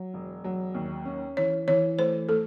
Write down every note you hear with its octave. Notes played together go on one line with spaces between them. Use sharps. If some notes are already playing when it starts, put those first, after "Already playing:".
Already playing: F#3
E1
F#3
D#2
C#4
E3 C#5
E3 C#5
A3 C5
A3 A4